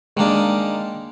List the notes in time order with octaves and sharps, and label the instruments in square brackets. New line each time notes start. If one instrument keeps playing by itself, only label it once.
[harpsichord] D#3 A#3 D4 [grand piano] G#3